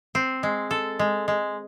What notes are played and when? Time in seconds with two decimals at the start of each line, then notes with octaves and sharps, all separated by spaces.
0.15 C4
0.43 G#3
0.71 A4
0.99 G#3
1.28 G#3